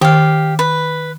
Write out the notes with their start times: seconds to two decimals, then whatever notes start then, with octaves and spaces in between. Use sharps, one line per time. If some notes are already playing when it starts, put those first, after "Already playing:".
0.01 D#3 G4 F5
0.59 B4